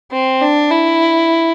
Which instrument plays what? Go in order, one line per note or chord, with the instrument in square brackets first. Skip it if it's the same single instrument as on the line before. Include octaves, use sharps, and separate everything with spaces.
[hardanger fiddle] C4
D4
E4